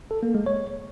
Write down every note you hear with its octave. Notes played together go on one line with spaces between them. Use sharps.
A4
A#3
G#3
C#5